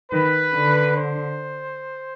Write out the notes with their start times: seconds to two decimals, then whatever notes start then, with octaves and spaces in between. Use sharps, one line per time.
0.12 D#3 B4
0.56 D3
0.97 C5